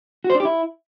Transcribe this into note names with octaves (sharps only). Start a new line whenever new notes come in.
F#4
C5
D4
G4
E4